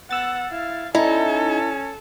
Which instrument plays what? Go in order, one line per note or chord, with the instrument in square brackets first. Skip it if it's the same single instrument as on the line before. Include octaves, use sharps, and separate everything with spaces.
[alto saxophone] B3 [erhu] F#5 [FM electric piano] E6 A6
[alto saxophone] E4 [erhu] F5
[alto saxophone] C#4 [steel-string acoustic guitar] D#4 [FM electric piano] E4 [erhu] A4